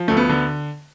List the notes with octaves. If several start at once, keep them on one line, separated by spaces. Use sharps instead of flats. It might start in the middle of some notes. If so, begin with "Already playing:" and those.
Already playing: F3
D2 A3
B3
D3